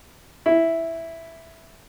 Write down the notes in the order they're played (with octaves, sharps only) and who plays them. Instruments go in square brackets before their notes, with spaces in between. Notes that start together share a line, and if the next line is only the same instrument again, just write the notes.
[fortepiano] E4